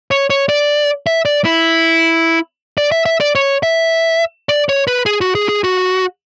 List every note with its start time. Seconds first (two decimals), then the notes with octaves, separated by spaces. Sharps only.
0.11 C#5
0.30 C#5
0.49 D5
1.07 E5
1.25 D5
1.45 E4
2.78 D5
2.92 E5
3.06 E5
3.20 D5
3.35 C#5
3.63 E5
4.49 D5
4.69 C#5
4.88 B4
5.06 G#4
5.21 F#4
5.35 G#4
5.49 G#4
5.64 F#4